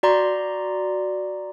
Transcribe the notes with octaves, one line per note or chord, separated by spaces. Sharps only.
F#4 D5 A#5 C6